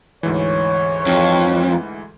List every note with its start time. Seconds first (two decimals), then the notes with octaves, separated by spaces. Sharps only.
0.23 D2 G#2 E3 C#5
1.06 F2